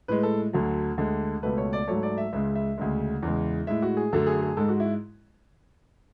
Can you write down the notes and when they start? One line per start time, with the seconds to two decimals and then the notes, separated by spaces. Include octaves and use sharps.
0.08 A2 G#3 B4
0.23 A4
0.53 D2 D3 F#3
0.98 D2 D3 G#3
1.43 C#2 B2 A3 B4
1.58 C#5
1.73 D5
1.88 G#2 F#3 A3 C#5
2.03 D5
2.18 E5
2.33 C#2 C#3 G#3 E5
2.55 E5
2.78 D2 C#3 G#3
3.23 E2 C#3 G#3
3.67 A2 G#3 E5
3.82 F#4
3.97 G#4
4.13 F#2 D3 F#3 A3 A4
4.27 G#4
4.42 G#4
4.57 G#2 G#3 A4
4.68 F#4
4.80 E4